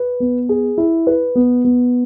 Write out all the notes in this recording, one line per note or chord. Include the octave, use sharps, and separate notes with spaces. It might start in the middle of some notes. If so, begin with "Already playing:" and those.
Already playing: B4
B3
G#4
E4
B4
B3
B3